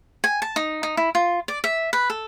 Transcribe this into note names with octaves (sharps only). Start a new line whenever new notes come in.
G#5
A5
D#4
D#4
E4
F4
D5
E5
B4
A4